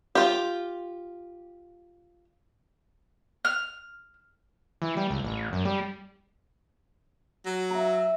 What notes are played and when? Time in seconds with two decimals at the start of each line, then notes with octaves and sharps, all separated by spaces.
0.15 F4 G4
3.45 F6
4.82 E3
4.97 G3
5.10 C#2
5.24 A1
5.52 F#2
5.65 G3
7.45 F#3
7.70 E5 A#5